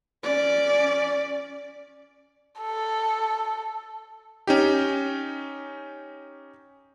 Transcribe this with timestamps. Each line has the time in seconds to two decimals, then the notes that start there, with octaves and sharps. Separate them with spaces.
0.23 C#4 D5
2.60 A4
4.47 C#4 D#4 G4